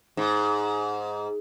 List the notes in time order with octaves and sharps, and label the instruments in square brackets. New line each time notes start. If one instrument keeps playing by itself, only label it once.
[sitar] G#2